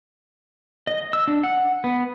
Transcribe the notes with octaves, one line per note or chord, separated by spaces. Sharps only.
D#5
E6
D4
F#5
B3